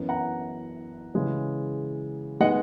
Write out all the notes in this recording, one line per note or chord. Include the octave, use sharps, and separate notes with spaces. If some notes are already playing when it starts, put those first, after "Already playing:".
Already playing: F#2 E3 B3
F#5 A#5
C#3 E3 G#3 C#4
D#3 G#3 B3 D#5 F#5